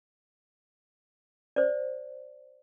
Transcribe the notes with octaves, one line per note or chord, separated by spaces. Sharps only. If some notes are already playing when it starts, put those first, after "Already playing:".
C5 D5